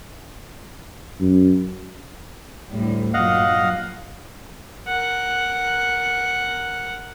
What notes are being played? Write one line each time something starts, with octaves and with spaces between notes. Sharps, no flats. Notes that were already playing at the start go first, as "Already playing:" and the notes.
F#2
D2 A2 G3
G2 A#2 F#3 D#5 F5 F#5
A#4 F#5